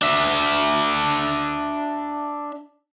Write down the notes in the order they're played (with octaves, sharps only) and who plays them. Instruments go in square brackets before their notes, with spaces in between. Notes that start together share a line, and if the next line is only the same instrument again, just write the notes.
[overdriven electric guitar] D4 E5